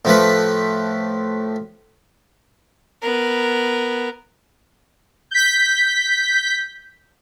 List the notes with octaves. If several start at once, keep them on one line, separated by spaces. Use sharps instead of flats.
A2 F3 A3 B4
B3 A#4
G6 B6